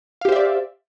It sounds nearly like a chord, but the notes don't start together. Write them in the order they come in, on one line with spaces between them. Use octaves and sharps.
F5 G4 C5 E5 D5